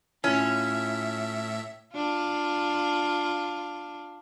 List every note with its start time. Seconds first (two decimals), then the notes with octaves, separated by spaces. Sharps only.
0.24 A2 C#4 E4 F4 E5
1.95 D4 F4